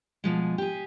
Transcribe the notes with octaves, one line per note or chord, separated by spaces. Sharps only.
B2 F3 G#3
G4 G#4